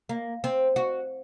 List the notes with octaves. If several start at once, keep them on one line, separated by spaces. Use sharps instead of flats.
A#3
C4
F#4